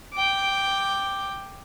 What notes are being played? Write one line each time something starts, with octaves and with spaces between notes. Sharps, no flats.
G5 D6